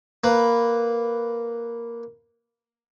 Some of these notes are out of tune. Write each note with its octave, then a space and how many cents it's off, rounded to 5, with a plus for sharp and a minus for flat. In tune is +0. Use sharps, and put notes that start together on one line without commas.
A#3 +0 B4 +0